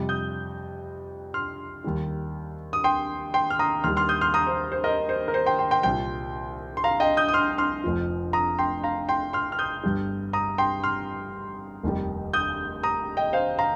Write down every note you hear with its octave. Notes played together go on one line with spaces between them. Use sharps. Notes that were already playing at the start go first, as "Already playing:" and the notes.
Already playing: F2 C3 G3
D#6 G6
C6 F6
D#2 D#3 G3
D#6
G5 C6
G5 C6
F6
A#5 D#6
D#2 D#3 G3 C6 F6
C6 F6
D#6 G6
C6 F6
A#5 D#6
C5
C5
A#4 D#5
C5
A#4
C5
G5 C6
G5 C6
G5 C6
C2 A#2 G3 G5 C6
C6
F5 A#5
D#5 G5
D#6 G6
D#6
C6 F6
C6 F6
F1 F2 F3
A#5 D#6
G5 C6
F5 A#5
G5 C6
C6 F6
F6
D#6 G6
G1 G2 G3
A#5 D#6
G5 C6
C6 F6
F1 D#2 D#3 G3
D#6 G6
A#5 D#6
D#5 G5
C5 F5
F5 A#5